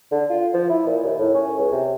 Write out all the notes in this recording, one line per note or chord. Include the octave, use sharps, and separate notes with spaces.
D3
F4
F3
E4
A#2
D#2
A2
C#4
C#2
C3